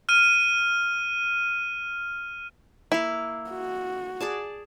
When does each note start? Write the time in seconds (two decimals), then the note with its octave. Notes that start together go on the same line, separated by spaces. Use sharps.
0.09 F6 D#7
2.92 A#3 E4 F5
3.51 F#4
4.20 G#4 D5 A5